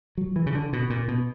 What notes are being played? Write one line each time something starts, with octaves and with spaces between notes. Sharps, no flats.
F#3
E3
C#3
D3
B2
A#2
B2